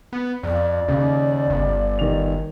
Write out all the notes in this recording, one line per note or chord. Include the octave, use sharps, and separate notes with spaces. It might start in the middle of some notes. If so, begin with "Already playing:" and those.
B3
F2 D5
D#2 C#3
G1
D#3 G4 F7